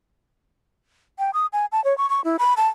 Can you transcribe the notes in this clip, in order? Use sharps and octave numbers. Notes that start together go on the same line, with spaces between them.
G5
D#6
G#5
A5
C#5
C#6
C#6
E4
B5
A5